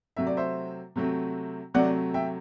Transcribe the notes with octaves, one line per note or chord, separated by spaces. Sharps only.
C3 F#3 A3 C4 E5
D5
C5 E5
C3 F#3 A3 C4
C3 F#3 A3 C4 D5 F#5
E5 G5